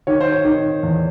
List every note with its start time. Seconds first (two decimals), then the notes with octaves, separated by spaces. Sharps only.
0.07 D#3 C#5
0.21 C5
0.32 C#5
0.45 D#3
0.83 E2